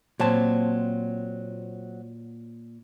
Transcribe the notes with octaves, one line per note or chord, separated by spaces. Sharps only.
A#2 F#3 C4 A5